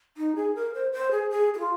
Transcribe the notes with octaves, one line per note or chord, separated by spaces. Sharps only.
D#4
G#4
A#4
C5
C5
G#4
G#4
G#4
F4